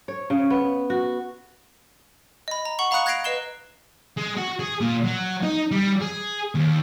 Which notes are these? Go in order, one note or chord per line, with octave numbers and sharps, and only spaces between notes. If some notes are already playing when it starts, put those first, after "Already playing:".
C#5
C#3
B3
F#4
D#5 B5
A#5
F#5 C#6 F#7
F5 A#5 B5 D#6 F#6 C#7
F#6 G#6 A#6 C7 D7 F7
B4 D#5 C7 E7 G7
G#3
F#4
G#4
A#2
F#3
D#4
G3
G#4
D#2